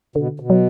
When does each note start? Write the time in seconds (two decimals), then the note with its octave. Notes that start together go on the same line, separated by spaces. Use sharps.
0.16 B2 D3
0.40 B2
0.50 F#3